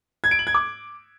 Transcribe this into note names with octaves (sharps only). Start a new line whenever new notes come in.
G#6
D7
F#7
G#6
D6